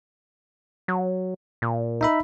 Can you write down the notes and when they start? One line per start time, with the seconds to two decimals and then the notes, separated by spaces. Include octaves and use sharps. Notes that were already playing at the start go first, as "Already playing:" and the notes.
0.88 F#3
1.62 A#2
2.01 D#4 E5 B5